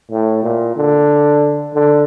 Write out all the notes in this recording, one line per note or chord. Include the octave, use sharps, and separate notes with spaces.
A2
A#2
D3
D3